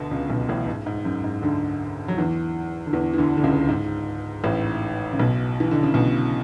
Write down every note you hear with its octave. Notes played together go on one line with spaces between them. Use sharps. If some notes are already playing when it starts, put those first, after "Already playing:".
Already playing: D2 B2 D3
C#2 C#3
B1 B2
A1 A2
G#2
G#2
F#2
G#2
D2 D3
F#3
E2 E3
D3
E2 E3
E3
D2 D3
D3
C#2 C#3
G#2
A1 A2
C#3
B1 B2
E3
D3
C#3
B1 B2